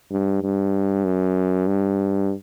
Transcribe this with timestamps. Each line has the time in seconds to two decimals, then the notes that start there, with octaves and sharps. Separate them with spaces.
0.11 G2
0.42 G2
1.05 F#2
1.67 G2